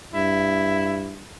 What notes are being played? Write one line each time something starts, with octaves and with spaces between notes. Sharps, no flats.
G2 E4